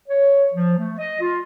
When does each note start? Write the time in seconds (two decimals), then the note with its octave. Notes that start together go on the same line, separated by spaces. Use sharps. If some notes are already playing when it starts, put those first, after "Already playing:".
0.07 C#5
0.52 F3
0.77 A3
0.98 D#5
1.21 F4